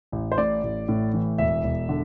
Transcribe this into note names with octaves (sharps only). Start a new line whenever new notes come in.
A1
C5
A2 D5
A1
A2
E3
E1 E5
E1
D3